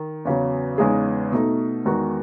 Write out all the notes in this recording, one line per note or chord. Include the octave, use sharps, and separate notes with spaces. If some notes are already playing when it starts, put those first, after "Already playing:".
Already playing: D#3
E2 C#3 F#3
E2 C#3 G#3 D#4 G#4
B2 A3 D#4
E2 D#3 G#3 D#4 F#4